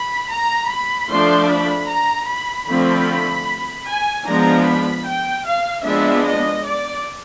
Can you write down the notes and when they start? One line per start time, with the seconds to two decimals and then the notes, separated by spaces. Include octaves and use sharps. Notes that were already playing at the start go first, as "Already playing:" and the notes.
Already playing: B5
0.30 A#5
0.69 B5
1.09 F3 A3 D4 C6
1.50 B5
1.89 A#5
2.28 B5
2.68 D3 F3 A3 C4 B5
3.88 G#5
4.26 F3 G#3 B3 D4 A#5
4.66 B5
5.06 G5
5.45 F5
5.85 F3 G#3 B3 D4 E5
6.25 D#5
6.65 D5